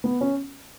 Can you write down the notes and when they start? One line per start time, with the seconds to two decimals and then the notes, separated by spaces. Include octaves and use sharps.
0.04 B3
0.21 C#4